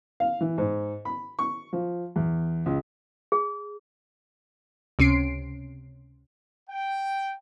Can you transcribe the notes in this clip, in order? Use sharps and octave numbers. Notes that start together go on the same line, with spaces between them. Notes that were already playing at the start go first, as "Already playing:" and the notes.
F5
E3
G#2
B5
C#6
F3
E2
C#2
G#4
C#2 C3 C#4 C7 D7
G5